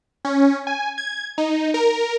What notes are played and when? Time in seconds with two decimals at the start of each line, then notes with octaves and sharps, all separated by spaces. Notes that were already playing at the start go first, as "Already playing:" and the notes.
0.25 C#4
0.67 G#5
0.98 G#6
1.38 D#4
1.74 A#4